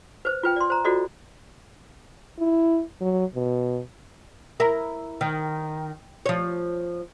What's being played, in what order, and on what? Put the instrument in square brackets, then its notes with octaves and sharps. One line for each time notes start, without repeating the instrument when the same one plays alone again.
[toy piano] B4 C5
F4 B4 G5
D5 C6
C5 A#5
F4 F#4 A4 C5 D5 D#5
[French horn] E4
F#3
B2
[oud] E4 A#4
D#3
F3 C#5